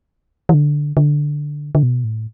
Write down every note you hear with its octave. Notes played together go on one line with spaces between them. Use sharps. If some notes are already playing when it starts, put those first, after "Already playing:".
E3
D3
D3
D3
B2
A2